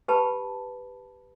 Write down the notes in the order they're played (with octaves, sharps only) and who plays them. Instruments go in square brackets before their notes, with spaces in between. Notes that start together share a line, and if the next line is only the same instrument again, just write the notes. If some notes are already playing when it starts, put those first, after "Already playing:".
[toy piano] G4 B4 A5 B5